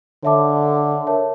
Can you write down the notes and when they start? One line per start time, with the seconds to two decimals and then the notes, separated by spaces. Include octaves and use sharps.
0.23 D3 C#5 E5 A5 D6
1.07 A#4 C#5 E5 A5